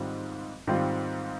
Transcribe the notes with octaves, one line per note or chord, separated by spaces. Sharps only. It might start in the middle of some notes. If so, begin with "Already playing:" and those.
Already playing: G#2 D#3 G3 C4 F4
G#2 D#3 G3 C4 F4